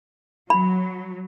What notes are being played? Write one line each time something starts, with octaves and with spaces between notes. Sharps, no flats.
F#3 B5